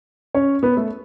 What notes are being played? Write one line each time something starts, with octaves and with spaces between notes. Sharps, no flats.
C#4 C#5
B3 B4
A3 A4